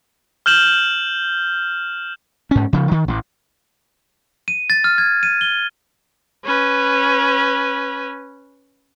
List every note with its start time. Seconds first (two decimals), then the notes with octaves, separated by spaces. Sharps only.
0.46 F6 G6 E7 F#7
2.51 G#2 C#4
2.73 C#3 F3
2.91 D#3
3.08 A1
4.48 D#7
4.70 A6
4.84 F6
4.98 G#6
5.23 D#7
5.41 G7
6.45 C#4 B4